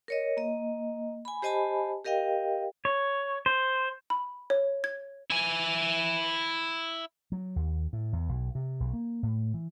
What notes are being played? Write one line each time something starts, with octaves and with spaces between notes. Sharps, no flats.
A#4 C#5 D#5
A#3 D#5
G#5 B5
G4 C5 D#5 G#5 A5 B5
G4 A#4 D#5 F5 G5
C#5
C5
B5
C#5
G#6
E4 G#5
F#3
D#2
A2
E2
B1
C3
B1
A#3
A2
E3